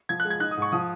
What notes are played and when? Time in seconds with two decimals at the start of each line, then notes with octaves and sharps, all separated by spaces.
0.09 F3 G#6
0.20 F#6
0.25 G#3
0.30 G#6
0.40 D#4 F#6
0.51 D#6
0.57 G#2 C#6
0.72 F3 D#6